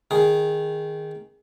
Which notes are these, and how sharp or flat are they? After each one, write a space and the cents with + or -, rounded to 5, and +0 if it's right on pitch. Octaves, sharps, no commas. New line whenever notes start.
D#3 +0 G#4 +0